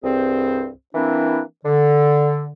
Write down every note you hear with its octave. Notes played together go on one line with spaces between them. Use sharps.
C2 G2 C4 G#4 C5
E3 A#3 C4 D4 E4
D3